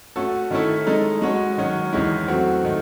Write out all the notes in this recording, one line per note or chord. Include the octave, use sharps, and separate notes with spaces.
A3 C#4 F#4 A4
D#3 A3 C#4 E4 A4
G#3 D#4 A4
G#3 C#4 F#4 C#5
D#3 F#3 C#4 F#4
E2 D#3 G#3 C#4 E4
F#3 A3 C4 F#4
D#3 A3